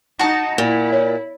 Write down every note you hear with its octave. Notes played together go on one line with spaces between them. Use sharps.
D#4 F#4 A5
A#2 E4
C#5